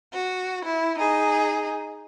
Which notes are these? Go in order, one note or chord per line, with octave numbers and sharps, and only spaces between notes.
F#4
E4
D#4 G#4